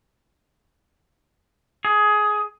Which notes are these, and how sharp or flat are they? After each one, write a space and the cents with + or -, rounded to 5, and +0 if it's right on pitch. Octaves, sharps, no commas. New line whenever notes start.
G#4 +15